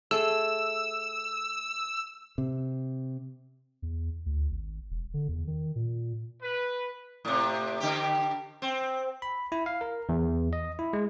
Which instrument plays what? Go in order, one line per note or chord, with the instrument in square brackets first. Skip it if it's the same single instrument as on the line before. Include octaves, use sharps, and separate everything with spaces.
[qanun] A3 G#4 A4 [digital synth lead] E6
[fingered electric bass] C3
[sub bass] E2
D2
G#1
E1
D3
E2
D#3
A#2
[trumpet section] B4
[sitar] A2 C3
D3 G4
C4
[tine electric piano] B5
E4
F5
A#4
E2
D#5
E4
G#3